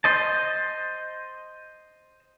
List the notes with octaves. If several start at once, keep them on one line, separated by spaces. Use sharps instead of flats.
C5 D#5 A5